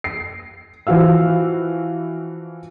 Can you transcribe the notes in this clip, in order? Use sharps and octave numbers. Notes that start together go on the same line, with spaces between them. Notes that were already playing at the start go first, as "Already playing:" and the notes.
C7
E3 F3 F#4 F5 E6